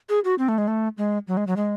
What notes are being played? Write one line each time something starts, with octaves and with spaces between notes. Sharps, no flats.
G#4
F#4
C4
A3
G#3
A3
G#3
F#3
G#3
F#3
G#3